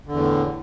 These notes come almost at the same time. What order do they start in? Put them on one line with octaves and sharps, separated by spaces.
D3 E2 A2